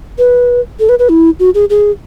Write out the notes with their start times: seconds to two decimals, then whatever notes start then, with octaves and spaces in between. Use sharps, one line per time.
0.18 B4
0.80 A4
0.89 B4
0.99 B4
1.09 E4
1.40 F#4
1.55 G#4
1.70 G#4